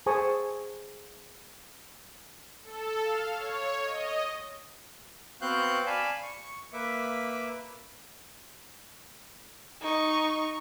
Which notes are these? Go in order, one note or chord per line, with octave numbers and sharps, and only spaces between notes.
G#4 C5 G#5 A5 C#6 D#6
A4
F5
C#5
D#5
B3 C4 F#4 F5 F#6 G6
D5 F5 G#5 A5 B5
C#6
A#3 B4 E5 D6
D#4 C#6